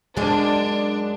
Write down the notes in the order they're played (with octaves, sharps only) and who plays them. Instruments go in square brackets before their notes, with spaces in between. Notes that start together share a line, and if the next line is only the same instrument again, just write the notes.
[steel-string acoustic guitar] F#2 G#3 [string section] D4